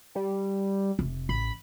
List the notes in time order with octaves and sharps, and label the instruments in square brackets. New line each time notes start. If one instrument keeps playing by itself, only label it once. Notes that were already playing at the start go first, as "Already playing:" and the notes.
[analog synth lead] G3
[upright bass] F1
[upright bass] A1 [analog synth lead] B5